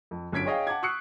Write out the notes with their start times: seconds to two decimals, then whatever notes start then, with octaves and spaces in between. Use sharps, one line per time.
0.11 F2
0.32 G1 F#2 G#6 B6 D7
0.45 G#4 C#5 D#5 F5 G5
0.67 F#5 A5 D6 G#6
0.83 C#6 D#6 E6 F#6 C7 C#7